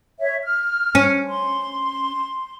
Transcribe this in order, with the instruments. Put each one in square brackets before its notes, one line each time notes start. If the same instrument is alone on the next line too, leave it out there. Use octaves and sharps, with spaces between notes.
[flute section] C#5 E5
F6
[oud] C#4
[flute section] C6